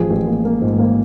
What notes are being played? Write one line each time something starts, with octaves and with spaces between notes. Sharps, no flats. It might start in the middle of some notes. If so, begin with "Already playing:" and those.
Already playing: A1 F3 G#4
A1
A#3
A#3
G#2
A#3